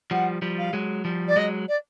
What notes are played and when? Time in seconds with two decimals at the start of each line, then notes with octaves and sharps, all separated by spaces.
0.11 F3 G3 F#5
0.42 F3 G3
0.58 F5
0.73 F#3 G#3
1.05 F3 G3
1.27 D5
1.36 F#3 G#3 D#5
1.68 D5